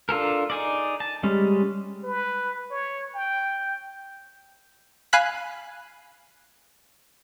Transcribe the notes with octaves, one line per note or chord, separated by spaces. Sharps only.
D4 F4 A4 A#4
D#4 G#4 D5
A5
G3 G#3 C#4
B4
C#5
G5
F5 G#5 B5 F#6 B6